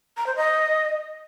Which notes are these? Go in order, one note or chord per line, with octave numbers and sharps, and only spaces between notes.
A#5
C5
D#5